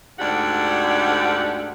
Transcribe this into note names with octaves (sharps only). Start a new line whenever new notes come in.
D2 G#2 D4 G4 F#5